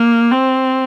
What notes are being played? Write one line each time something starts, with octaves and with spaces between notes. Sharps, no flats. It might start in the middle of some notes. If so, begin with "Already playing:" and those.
Already playing: A#3
C4